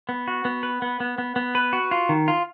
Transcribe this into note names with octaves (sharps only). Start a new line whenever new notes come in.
B3
F#4
B3
B4
B3
B3
B3
B3
B4
F#4
F4
D#3
F4